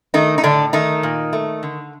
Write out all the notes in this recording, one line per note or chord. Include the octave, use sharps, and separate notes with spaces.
D#3 A3 D#4
D#4
A2 D3 D4
D#3 A3 D#4
A#2
A3
D3